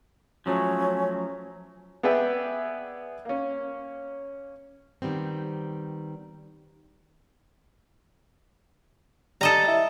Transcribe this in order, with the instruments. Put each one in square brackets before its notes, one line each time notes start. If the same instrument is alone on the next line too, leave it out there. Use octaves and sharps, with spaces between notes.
[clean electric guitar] F3 F#3 A3 [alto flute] C#4
[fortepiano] B3 G#4 B4 D5 E5 G5
A#3 C#4
[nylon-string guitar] D#3 G3 B3 C4
[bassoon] G3 [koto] A4 D#5 A#5
[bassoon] E4